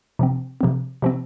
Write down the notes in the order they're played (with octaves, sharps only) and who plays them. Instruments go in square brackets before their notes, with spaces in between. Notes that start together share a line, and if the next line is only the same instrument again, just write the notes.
[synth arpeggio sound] C3 F3 C4
C3 F3 C4
C3 F3 C4